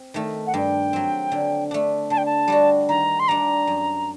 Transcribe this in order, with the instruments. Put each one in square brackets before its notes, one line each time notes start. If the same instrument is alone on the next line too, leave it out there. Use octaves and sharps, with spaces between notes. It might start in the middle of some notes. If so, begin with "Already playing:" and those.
Already playing: [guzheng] C4
D#3 A3
[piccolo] F#5
[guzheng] G2 [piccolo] G5
[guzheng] F#3 C4
D3
A3 D4
[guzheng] D3 [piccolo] A5
[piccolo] G5
A5
[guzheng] G3 D4 F#4
[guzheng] D#3 [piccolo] A#5
[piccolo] C6
[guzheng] G3 D4 [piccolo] A#5
[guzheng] F#2